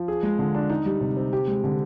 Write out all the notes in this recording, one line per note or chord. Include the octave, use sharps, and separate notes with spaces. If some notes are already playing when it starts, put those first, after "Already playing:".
Already playing: F3
G#4
G#3
D3
D4
D#4
G3
C3
C4
G4
G#3
D3